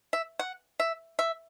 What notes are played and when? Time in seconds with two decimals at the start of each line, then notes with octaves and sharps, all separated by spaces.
0.13 E5
0.39 F#5
0.80 E5
1.19 E5